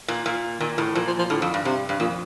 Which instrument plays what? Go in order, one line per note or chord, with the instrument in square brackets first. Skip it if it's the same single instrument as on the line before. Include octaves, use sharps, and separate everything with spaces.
[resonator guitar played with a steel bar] A#2
A#2
[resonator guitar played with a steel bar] A#2 [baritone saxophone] D#3
[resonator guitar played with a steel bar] A2 [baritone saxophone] D#3
[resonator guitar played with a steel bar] A#2 [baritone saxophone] F3
[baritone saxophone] F3
F3
[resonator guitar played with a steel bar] A2 [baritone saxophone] D3
[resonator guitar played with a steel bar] F2
G2
[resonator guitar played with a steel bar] G2 [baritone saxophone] C3
[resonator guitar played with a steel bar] G2
[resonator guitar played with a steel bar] F2 [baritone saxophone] A#2